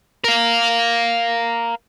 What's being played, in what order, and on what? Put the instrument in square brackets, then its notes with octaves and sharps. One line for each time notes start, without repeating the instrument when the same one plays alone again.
[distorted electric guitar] A#4 F5